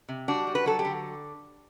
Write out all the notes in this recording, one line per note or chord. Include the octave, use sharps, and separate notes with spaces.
C3
G3 D4 F#4
G3
B4
F#3 A4
G4
D3